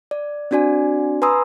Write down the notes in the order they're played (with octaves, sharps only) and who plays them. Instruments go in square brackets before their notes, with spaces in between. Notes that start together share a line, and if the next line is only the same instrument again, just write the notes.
[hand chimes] D5
C4 D4 F#4 D5 G#5
B4 G#5 A#5 C6 D#6 E6